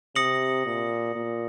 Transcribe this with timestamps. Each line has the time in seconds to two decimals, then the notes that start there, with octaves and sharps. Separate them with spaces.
0.16 C3 D#6 A#6 C#7 F#7
0.65 A#2
1.15 A#2